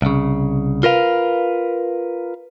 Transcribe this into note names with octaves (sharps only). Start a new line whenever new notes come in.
C2 C#3
F4 A#4 B4 F5